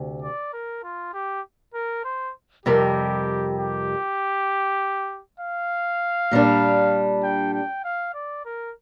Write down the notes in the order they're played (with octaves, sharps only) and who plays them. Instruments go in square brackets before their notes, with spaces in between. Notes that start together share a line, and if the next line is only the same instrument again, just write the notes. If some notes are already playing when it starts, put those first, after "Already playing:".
Already playing: [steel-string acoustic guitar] D2 C3
[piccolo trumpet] D5
A#4
F4
G4
A#4
C5
[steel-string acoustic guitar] F2 C3 G3 C4 A#4 [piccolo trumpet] G4
[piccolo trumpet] G4
F5
[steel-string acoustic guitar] A#2 G3 D4
[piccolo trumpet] G5
G5
F5
D5
A#4